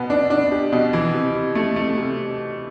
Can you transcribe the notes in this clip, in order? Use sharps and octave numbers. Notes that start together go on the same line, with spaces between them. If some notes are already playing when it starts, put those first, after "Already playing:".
Already playing: B2 B3
D4
D4
G4
B2
E3
C3
C3
A3
A3
C3